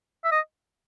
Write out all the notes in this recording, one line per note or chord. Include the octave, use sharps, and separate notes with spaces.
E5
D#5